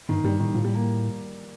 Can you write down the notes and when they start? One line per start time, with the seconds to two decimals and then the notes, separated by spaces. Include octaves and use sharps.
0.09 G2 D#3
0.24 G2 G3
0.39 A2 D#3
0.55 A2 F3
0.64 G3
0.75 A#3